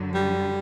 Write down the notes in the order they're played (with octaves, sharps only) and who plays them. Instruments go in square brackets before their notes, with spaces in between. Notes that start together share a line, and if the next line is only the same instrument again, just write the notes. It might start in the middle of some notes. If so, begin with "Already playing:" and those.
Already playing: [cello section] F#2 D3 F#3
[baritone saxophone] G3